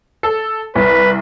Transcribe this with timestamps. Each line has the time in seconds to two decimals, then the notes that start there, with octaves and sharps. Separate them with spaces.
0.23 A4
0.76 C2 B4